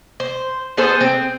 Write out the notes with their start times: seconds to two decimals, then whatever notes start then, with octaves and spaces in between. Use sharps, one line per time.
0.20 C5
0.77 B3 G#4 A4 C5
1.01 C4